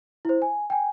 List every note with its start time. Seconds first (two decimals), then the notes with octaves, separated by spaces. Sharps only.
0.25 E4 C5
0.42 G#5
0.70 G5 G#5